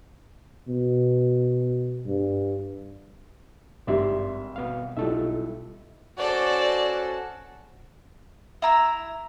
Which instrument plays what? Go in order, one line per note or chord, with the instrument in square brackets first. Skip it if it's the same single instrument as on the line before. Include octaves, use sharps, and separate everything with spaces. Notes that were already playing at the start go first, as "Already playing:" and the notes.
[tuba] B2
G2
[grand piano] G#1 E5 [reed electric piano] G2 D5 C6 [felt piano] G3 G4
[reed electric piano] B2 B3 F5
[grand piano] B1 [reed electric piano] G3 A4 E5 [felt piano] E4 F4
[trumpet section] C#4 F#4 [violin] A4 C5 [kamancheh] D5
[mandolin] E4 A#5 E6